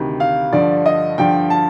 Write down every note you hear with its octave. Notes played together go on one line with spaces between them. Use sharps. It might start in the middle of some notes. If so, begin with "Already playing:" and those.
Already playing: D2 C3 D#3
F5
G2 D3 F3 D5
D#5
G2 D3 F3 G5
A5